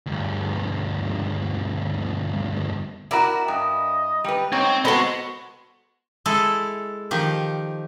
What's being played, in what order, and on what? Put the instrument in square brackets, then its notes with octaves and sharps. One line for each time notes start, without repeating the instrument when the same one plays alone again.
[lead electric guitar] D2 G2
[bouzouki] E4 [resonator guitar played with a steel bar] F#4 A#4 D5
[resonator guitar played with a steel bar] G2 [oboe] D#5
[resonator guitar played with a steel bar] G3 B4
[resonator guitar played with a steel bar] G#2 [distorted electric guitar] C4 [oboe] C#5
[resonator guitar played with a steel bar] B3 A4 [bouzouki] F#4 C5 [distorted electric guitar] D#5 C6 [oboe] B5
[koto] G#3 E4 A4
D#3 F3 G4